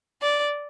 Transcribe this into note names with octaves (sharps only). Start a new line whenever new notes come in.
D5